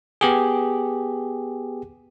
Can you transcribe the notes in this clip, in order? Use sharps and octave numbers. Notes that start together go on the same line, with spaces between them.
B3 G4 G#4